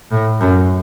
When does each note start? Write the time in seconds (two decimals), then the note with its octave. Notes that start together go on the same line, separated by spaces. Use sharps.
0.12 A2
0.41 F#2